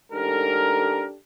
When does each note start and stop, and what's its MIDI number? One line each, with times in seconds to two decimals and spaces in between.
0.12 1.05 33
0.12 1.05 44
0.12 1.15 62
0.12 1.15 67
0.12 1.15 69
0.12 1.05 70